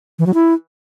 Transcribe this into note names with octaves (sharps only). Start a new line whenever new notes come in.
E3
F#3
E4